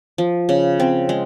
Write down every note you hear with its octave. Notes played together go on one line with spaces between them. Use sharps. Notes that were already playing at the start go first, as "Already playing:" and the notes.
F3
C#3
C4
G#3